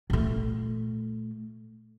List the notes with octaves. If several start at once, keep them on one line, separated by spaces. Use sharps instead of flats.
A#2 A3